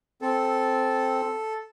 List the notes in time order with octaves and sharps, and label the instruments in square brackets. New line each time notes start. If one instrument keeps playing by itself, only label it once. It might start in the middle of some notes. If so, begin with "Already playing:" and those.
[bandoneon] C4 [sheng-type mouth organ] A4